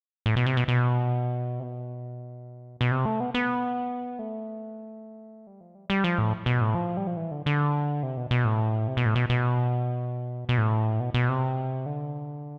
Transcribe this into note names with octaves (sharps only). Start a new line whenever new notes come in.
A2
B2
C3
B2
B2
C3
B2
B2
C3
A3
B3
B3
A3
G3
F3
G3
G3
F3
A2
B2
A2
F3
G3
F3
E3
D3
D3
C3
B2
B2
A2
C3
B2
A2
B2
B2
B2
A2
B2
B2
C3
D3